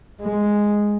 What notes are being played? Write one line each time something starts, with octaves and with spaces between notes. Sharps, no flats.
G#3